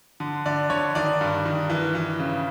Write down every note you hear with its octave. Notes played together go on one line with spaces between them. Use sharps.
D3
D3 D5
D3 C#5
D#3 D5
G2
D#3
E3
E3
C#3